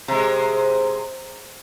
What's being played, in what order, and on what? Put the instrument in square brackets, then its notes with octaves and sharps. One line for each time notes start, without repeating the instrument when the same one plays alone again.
[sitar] C3 G#3